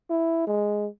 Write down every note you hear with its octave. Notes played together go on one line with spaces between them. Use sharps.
E4
G#3